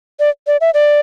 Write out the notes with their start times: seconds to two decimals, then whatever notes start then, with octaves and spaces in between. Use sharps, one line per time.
0.20 D5
0.47 D5
0.61 E5
0.74 D5